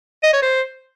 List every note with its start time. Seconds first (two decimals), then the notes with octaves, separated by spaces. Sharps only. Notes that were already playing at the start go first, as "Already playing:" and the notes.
0.23 D#5
0.33 C#5
0.42 C5